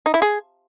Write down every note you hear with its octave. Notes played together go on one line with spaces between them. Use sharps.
D#4
E4
G#4